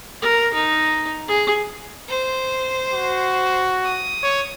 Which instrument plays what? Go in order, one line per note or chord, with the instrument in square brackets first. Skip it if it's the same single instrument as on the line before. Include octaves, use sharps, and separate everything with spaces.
[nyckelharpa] A#4
D#4
G#4
[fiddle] C5
[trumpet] F#4
[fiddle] D#6
[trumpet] C#5